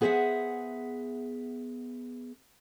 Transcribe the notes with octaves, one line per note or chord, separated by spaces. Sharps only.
B3 G#4 C5 D#5 E5 F#5